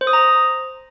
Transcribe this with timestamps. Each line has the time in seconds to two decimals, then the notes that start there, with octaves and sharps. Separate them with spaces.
0.01 C5
0.07 D#6
0.13 A#5